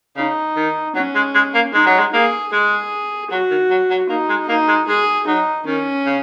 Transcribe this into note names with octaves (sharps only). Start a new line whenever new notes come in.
C#3 D#4
D#3
F#3 C#4
G#3
G#3
A#3
G#3 D#4
F#3
G#3
A#3 G#4
G#3 G#4
F#3 F#4
D#3
F#3
F#3
A#3 D#4
G#3
A#3 D#4
G#3
G#3 G#4
F#3 D#4
D#3 C#4
C#3